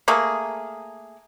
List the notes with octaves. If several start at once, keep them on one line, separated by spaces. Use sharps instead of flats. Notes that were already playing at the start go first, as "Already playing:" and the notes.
A3 A#3 G#4